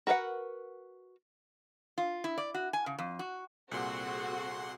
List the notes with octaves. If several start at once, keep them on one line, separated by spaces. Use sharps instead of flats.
F#4 A#4 B4 E5 F#5
F4
E4
D5
F#4
G#5
C#3
F2
F#4
C2 A#2 C4 F#4 G#4 A4 F#5 C6